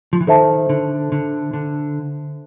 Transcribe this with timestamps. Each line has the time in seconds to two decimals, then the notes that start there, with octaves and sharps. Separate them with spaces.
0.13 F3
0.21 E3
0.27 D#3 A4 C5 E5 A5
0.69 D3
1.12 D3
1.53 D3